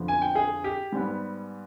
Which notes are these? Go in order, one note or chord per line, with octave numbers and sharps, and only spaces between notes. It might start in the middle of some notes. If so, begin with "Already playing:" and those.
Already playing: F2 D3 F3 B3
G#5
G5
G#4
G4
G#2 G3 B3